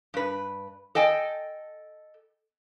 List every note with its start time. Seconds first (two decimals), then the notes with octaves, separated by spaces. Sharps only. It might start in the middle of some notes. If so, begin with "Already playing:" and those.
0.14 G2 B4
0.95 A4 D#5 G5 G#5